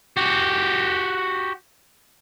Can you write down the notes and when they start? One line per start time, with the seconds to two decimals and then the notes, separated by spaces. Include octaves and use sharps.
0.17 F#4 G4